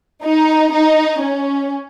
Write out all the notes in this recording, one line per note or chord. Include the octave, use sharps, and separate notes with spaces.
D#4
D#4
C#4